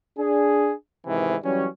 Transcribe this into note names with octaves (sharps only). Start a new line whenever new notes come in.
D4 G#4
E2 G#2 C3 D#3 E3
E3 F#3 G3 C#4